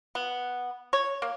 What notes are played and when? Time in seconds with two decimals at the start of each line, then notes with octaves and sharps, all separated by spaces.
0.15 B3
0.93 C#5
1.22 A#3